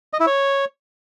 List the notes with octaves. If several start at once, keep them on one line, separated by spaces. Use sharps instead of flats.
D#5
E4
C#5